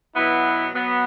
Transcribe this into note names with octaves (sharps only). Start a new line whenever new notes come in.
B2 F#3 B3 E4
F#3 B3